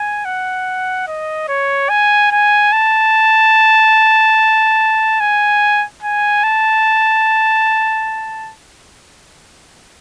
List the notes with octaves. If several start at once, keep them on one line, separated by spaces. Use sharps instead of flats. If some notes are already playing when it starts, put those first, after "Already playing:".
Already playing: G#5
F#5
D#5
C#5
G#5
G#5
A5
G#5
G#5
A5